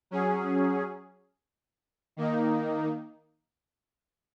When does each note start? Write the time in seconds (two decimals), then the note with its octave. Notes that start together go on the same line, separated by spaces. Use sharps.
0.11 F#3 C#4 G#4
2.17 D#3 A#3 D#4